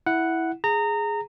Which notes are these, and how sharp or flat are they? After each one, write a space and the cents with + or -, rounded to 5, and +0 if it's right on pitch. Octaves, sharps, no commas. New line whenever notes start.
E4 -5 F#5 +0
G#4 +0 A#5 -25